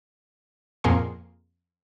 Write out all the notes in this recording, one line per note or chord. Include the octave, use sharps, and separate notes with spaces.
F2 A#2 A#3 G#4 C6